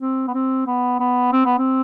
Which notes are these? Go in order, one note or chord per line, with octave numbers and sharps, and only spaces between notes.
C4
B3
C4
B3
B3
C4
B3
C4